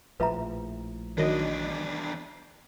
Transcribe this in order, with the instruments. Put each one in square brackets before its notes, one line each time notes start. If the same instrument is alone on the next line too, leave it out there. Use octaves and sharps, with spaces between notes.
[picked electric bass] A#1 A2 F3 [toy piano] B4 E5 A#5
[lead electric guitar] E2 D4 [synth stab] D#3 F#3 D#5